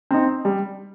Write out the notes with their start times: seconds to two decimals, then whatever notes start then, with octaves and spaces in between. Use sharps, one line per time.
0.11 C4 D#4
0.45 G3